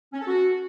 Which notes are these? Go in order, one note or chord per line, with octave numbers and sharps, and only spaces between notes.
C#4
A4
F#4